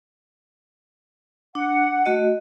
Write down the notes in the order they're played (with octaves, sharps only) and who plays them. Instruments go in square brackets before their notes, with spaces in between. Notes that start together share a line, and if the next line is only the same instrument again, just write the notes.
[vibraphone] D4 [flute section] F#5
[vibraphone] A3 F#4 D#5